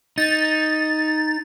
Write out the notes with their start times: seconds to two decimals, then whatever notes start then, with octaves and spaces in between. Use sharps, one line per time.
0.18 D#4 A6